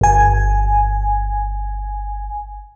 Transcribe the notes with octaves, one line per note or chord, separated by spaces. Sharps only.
G1 G#5